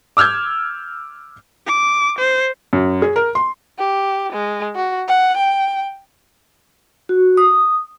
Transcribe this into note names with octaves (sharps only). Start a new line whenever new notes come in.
D6 E6 F6 G6 G#6
D6
C5
F#2
G#4
A#4
C6
G4
G#3
F#4
F#5
G5
F#4
D#6